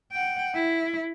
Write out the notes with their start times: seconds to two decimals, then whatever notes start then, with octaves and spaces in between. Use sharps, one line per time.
0.12 F#5 G5
0.55 E4